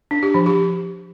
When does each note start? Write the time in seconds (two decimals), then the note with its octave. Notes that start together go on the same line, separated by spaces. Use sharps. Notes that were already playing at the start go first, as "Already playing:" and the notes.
0.11 D4
0.23 G4
0.34 F3
0.46 G4